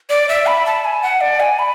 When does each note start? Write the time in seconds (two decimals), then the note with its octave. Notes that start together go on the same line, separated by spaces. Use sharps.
0.10 D5
0.29 E5
0.47 B5
0.66 A5
0.85 G#5
1.02 F#5
1.21 D5
1.40 G#5
1.59 B5